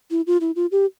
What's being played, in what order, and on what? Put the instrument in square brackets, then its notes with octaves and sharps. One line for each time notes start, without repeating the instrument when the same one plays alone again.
[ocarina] E4
F4
E4
F4
G4